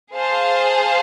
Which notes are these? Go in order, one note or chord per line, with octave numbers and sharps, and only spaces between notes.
G#4 C5 F5 A5